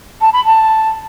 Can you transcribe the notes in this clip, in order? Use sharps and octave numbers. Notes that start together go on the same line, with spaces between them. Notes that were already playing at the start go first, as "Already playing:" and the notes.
A5
B5
A5